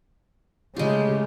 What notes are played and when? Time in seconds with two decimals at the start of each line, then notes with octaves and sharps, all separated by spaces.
0.76 C#3 G#3 A3 F4 G4